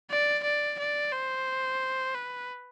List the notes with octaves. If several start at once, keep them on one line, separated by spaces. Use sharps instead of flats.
D5
D5
D5
C5
B4